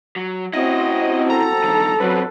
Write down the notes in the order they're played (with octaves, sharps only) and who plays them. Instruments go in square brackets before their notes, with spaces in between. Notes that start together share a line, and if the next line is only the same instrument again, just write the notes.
[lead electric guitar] F#3
[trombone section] C4 F#4 [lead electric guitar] C#4 E4 [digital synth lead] D#5
[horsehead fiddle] A4 [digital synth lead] A#5
[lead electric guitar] G2 D#3
[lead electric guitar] F#2 C4 [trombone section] F#3 [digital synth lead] B4